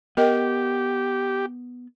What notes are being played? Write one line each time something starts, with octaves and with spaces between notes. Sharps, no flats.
B3 G4 A#4 D#5 G5